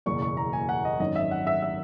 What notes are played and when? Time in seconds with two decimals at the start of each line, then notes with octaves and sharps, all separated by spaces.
0.06 F#1 E2 B2 A#3 C#6
0.22 C#6
0.37 A#5
0.53 G#5
0.69 F#5
0.85 D#5
1.00 G#1 F#2 D#3 D#5
1.16 E5
1.31 F#5
1.47 E5
1.62 E5